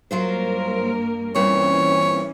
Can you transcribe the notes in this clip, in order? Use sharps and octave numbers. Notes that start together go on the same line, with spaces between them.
G2 F#3 A#3 F4 A#4 C5
G2 A#2 E3 C4 C#4 C#5